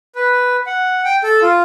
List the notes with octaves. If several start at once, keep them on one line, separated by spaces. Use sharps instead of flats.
B4
F#5
G5
A4
F4